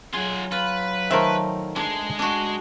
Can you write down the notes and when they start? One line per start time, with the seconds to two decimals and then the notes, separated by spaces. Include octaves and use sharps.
0.13 F#3 F4 G#4 F#5
0.52 F4 B4
1.11 D#3 A3 A#4 C5 E5
1.76 G#3 D4 G#4
2.19 D4 F#4